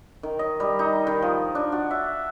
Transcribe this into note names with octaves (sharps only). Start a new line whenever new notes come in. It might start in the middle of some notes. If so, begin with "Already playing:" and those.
D#3
D#5
G3
D#4
D#3
F3
D4
F#4
E5